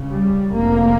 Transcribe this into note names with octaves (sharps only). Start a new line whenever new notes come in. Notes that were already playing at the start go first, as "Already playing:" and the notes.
Already playing: C#2 C#3
G3
F1 F2 C3 A#3